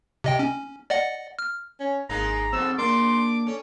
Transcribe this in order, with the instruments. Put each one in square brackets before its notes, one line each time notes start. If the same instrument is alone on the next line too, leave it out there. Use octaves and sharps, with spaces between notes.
[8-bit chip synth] C3 D#5 G5
C#4
D5 D#5 F#5
F6
[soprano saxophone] C#4
[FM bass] G#1 [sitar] G#3 A#3 D#4 [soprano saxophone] A#5
[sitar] F2 B2 [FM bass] C4 [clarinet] E6
[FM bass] A#3 [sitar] D4 [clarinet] C6 [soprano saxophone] D6
[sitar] C#4 [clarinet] A4